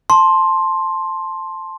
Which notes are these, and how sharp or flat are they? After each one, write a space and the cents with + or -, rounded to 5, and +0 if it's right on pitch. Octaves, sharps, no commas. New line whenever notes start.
A5 +0 C6 +10